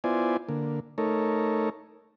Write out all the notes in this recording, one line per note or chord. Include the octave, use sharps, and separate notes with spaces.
B3 E4 F4 C5 D5 G#5
D3 A#3
A3 D#4 A4 A#4 C#5